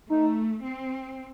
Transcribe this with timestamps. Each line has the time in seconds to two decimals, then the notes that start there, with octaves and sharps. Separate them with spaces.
0.10 A3 D#4
0.63 C4